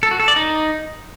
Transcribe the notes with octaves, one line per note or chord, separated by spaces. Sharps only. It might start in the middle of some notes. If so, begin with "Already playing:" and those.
A4
F#4
A4
D5
D#4